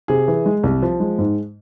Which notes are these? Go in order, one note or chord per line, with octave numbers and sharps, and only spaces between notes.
C3 G#4
E3
G#3
C2
F3
G#3
G#2